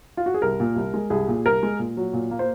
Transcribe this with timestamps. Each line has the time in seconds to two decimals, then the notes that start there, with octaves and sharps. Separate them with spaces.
0.17 F4
0.26 F#4
0.34 G#4
0.42 C2 A#4
0.60 A#2
0.76 C2
0.94 G#3
1.10 C2 G#4
1.28 A#2
1.46 C2 A#4
1.63 G#3
1.79 A#2
1.97 F#3
2.13 A#2
2.31 A#3
2.39 C5